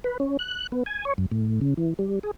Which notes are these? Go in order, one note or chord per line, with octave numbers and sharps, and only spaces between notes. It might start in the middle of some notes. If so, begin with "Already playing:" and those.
B4
C#4
F#6
B3
G#5
C#5
F#2
A2
C#3
E3
G3
G#4